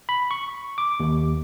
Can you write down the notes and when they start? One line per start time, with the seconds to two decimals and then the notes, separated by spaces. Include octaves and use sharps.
0.09 B5
0.31 C#6
0.78 D6
1.00 D#2